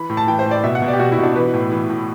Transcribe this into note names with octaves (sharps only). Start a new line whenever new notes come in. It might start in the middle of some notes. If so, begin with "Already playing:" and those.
Already playing: E3 B5
A2
A5
E3 G5
C5
A2
D5
B2 E5
F#5
B2
D5
G4
B2 F#4
E4
B2
D4
E3 B4
A2
E3
A2